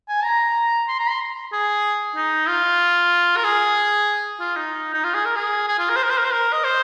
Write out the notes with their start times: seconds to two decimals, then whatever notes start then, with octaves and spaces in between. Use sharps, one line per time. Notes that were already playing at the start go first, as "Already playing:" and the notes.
0.08 G#5
0.24 A#5
0.88 C6
0.99 A#5
1.10 C6
1.52 G#4
2.16 D#4
2.48 F4
3.37 A#4
3.44 G#4
4.40 F4
4.56 D#4
4.94 D#4
5.04 F4
5.15 G#4
5.25 A#4
5.36 G#4
5.68 G#4
5.79 F4
5.89 A#4
5.96 C5
6.03 A#4
6.10 C5
6.17 A#4
6.25 C5
6.31 A#4
6.53 D#5
6.64 C5